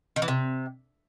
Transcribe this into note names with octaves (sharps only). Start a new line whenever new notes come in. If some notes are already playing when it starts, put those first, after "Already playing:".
D#3
E3
C3